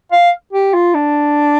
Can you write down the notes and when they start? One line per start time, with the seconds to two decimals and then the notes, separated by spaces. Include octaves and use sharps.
0.12 F5
0.53 G4
0.74 F4
0.94 D4